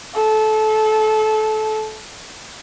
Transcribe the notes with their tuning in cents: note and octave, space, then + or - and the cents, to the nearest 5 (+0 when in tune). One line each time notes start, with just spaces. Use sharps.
A4 -25